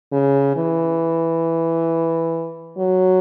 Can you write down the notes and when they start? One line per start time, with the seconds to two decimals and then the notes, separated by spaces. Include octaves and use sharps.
0.12 C#3
0.56 E3
2.79 F#3